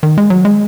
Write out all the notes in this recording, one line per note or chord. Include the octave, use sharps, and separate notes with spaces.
D#3
G#3
F#3
G#3